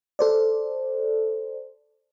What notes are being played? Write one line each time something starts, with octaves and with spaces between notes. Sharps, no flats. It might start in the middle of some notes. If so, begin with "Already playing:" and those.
A4 C5 D5